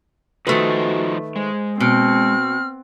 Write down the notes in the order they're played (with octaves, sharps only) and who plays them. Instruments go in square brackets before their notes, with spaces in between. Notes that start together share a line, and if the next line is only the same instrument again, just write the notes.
[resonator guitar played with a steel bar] D#3 A3 B4 [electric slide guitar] F3 D#4 C5 [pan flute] F#4
[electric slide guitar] G#3 [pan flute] C5
[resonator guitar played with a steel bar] B2 [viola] C4 [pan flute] F6